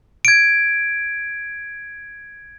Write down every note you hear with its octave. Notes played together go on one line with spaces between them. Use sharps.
G#6 D7